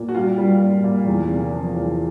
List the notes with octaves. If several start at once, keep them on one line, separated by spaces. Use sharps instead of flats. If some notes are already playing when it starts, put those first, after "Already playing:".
Already playing: A#2
F#4
G3 F4
G3
A#2
A#2
E2
C3
F3
E2